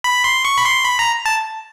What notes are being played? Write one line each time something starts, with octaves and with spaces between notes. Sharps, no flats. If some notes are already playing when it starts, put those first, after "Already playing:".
B5
C6
C#6
B5
C6
B5
A#5
A5